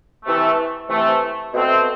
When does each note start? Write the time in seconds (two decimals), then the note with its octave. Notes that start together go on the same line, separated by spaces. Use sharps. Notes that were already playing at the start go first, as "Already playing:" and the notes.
0.25 C3 E3 A3
0.90 C3 E3 A3
1.54 B2 A3 C4